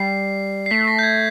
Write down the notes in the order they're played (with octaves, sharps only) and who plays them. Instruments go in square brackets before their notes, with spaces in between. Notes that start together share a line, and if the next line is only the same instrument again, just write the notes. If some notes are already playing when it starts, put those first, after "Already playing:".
Already playing: [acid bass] G3 [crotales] C7
[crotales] C7
[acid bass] A3 [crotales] B6
[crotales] A#6
G6
G#6